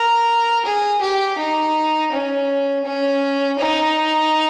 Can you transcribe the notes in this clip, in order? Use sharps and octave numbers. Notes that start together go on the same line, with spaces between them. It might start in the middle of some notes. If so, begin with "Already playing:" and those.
Already playing: A#4
G#4
G4
D#4
C#4
C#4
D#4